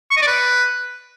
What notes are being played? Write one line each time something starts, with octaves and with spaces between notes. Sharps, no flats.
C#6
D#5
D5
B4